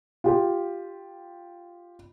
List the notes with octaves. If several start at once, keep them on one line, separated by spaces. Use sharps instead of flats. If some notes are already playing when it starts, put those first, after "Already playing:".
F4 G4